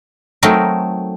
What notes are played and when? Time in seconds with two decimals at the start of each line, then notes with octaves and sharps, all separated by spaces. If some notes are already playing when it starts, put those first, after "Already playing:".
0.43 F#3 A3 C4 D#4 A#4